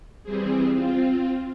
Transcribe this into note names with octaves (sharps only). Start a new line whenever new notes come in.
E3 G3 C4 G#4
C4 F4